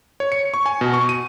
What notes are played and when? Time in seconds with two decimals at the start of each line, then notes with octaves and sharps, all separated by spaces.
0.20 C#5
0.32 C#7
0.54 C#6
0.66 G#5
0.81 B2
0.94 C#6
1.09 D#7